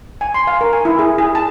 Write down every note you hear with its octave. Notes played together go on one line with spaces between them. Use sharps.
G#5
C6
F5
A#4
G#5
E4
G#4
G#4
A5